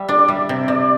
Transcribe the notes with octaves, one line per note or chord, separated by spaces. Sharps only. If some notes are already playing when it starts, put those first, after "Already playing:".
Already playing: G3 E5
D4 D5
D5
G3 E5
C3
C3 D5